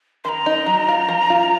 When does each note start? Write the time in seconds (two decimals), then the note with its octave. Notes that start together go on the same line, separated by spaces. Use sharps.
0.24 D#3 A#5 C6
0.46 D#4
0.66 F#3
0.88 F4
1.09 F3
1.30 F4